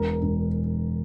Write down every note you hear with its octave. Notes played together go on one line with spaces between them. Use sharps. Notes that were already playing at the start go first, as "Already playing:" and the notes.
Already playing: E1 A#4
E1